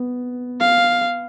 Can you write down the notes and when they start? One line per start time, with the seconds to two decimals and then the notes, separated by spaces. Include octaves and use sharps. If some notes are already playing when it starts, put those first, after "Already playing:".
Already playing: B3
0.61 F5